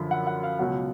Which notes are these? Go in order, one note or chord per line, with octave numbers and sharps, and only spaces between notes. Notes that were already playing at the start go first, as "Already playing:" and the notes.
Already playing: F#2 D3 F3 B5
F#5
F#5
F5
C#2 B2 F#3 F#5